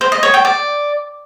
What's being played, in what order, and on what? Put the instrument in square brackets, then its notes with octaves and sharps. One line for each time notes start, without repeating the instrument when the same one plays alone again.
[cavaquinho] C5
D#5
C#5
G5
D5